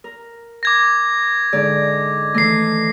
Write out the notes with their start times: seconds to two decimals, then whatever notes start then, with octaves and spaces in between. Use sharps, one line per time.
0.04 A#4
0.63 D6 G#6 A#6
1.53 G#2 D3 D5
2.34 D#3 E3 A3 A#6 C7